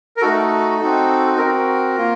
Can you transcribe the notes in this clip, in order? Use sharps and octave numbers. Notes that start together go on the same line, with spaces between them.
A#4
A3 D#4 F#4 A4
C4 D#4 F#4
C4 F#4 A#4
A#3 F4